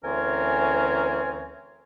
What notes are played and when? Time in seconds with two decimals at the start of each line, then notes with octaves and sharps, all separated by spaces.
0.03 D2 E3 C4 C#4 A#4 G#5